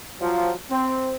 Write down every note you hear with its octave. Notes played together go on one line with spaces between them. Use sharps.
F3 F#3
C4